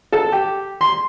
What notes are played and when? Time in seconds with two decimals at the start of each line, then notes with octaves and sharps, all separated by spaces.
0.12 A4
0.32 G4
0.81 C6